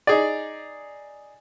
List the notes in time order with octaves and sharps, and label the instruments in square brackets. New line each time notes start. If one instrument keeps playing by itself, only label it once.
[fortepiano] D#4 G#4 D5